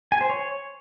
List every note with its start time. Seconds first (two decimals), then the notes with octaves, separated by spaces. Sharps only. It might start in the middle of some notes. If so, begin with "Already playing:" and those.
0.12 G#5
0.21 C5
0.30 C#5